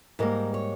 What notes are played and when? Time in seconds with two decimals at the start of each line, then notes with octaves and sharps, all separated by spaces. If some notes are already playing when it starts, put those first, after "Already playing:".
0.19 G#2 G3 A#3 A#4
0.54 C#5